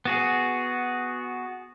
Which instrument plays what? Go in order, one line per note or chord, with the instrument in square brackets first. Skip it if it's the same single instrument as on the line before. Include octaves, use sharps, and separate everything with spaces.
[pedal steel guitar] B3 F#4 G#4